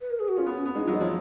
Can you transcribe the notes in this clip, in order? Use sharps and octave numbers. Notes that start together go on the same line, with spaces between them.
B4
A#4
G#4
F#4
C#4 F4
B3
C#4
B3
G#3 D#4
F4
F#3
D#5
F3 C#5